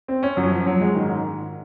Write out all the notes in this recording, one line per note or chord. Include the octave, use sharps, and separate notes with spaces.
C4
C#4
F#2 F3 F#3
F3
F#3
G#3
G#2 D#3